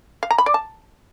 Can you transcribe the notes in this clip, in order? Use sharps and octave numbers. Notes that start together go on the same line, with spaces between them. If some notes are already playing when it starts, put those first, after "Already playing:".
F5
A#5
B5
D5
A5